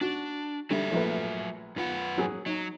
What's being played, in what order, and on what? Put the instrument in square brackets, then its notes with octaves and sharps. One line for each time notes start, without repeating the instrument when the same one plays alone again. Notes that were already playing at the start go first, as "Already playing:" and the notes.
[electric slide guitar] D4 [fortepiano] F#4
[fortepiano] D3 G3 [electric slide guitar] F#3 E5
[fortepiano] A#1 A3 B4
[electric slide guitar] F#2 B4 F#5 [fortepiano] F4
[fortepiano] F#3 G#4
[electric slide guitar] F#3 [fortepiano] D#4